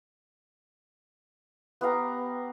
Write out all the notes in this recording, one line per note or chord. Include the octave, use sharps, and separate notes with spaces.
B3 G4 F5 A#5